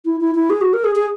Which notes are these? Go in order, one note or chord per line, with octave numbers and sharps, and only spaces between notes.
E4
E4
E4
G#4
F#4
A#4
G#4
G#4